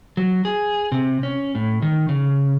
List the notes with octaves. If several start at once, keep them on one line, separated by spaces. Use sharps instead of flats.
F#3
G#4
C3
C#4
A2
D#3
C#3